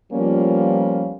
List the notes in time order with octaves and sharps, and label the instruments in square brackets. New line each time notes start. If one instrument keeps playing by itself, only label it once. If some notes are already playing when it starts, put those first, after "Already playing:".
[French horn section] F3 G3 A#3 B3 C#4 F4